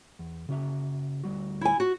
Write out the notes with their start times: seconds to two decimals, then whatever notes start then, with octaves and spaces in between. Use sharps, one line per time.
0.19 E2
0.49 C#3 F#4 E5
1.24 D2 G3 F#4
1.61 E4 G#5
1.80 F#4